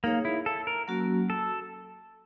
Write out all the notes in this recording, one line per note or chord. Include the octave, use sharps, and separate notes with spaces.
A#3 D#4 G#4 C#5 F5
E4
A4
A#4
F#3 A#3 C#4 F#4
A4